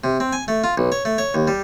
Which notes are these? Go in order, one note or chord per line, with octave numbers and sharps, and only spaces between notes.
C3
C4
G#5
A3
F4
B1
C#5
A3
C#5
D#2
G3